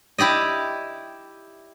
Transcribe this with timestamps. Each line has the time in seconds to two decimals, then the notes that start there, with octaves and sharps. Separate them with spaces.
0.18 E4 G4 D5 D#5